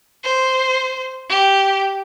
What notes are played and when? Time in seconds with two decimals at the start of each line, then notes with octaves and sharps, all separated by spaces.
0.24 C5
1.29 G4